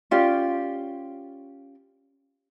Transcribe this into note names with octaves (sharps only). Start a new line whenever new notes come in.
C#4 F4 G4 D5